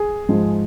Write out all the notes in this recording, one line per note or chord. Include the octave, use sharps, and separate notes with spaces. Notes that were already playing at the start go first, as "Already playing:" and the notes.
Already playing: G#4
G#2 F3 G#3